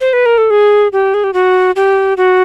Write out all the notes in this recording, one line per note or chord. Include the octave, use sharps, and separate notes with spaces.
C5
B4
A#4
A4
G#4
G4
G#4
G4
F#4
G4
F#4